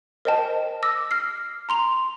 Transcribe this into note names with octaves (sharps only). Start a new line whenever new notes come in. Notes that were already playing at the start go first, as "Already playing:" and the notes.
A#4 C5 D#5 G5 A5
D6 E6 A#6
F6 C7
A#5 C6 F7